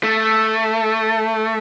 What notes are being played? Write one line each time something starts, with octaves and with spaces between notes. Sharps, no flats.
A3